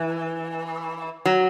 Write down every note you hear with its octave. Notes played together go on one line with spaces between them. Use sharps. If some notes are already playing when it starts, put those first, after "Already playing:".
Already playing: E3
F#3